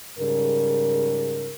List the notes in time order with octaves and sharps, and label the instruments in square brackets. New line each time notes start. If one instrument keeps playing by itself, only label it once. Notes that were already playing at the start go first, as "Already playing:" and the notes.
[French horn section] G#2 C#3 G3 A#4